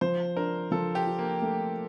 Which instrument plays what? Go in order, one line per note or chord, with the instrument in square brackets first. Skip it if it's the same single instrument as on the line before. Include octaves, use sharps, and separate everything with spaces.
[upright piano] F3 [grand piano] C5
[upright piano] D4 [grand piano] A#4
[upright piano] F3 [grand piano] A4
[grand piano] G4
[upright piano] F4
[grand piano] A#3
[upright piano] A3